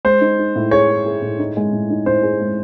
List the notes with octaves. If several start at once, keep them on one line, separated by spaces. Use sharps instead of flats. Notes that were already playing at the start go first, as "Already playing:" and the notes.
G#3 C5
D#4
D#4
A2
G#4 C#5
G#4
G#4
A2
D#4
G#3
A2
D#4
A2 C5
G#4
G#3